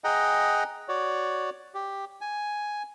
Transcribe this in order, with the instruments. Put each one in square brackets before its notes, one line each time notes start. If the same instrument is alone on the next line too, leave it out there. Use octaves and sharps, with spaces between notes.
[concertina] G#4 D#5 F#5 G5 A#5
F#4 C#5 D5
G4
G#5